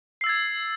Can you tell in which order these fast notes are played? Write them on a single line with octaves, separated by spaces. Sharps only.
C7 E6 A6 G#6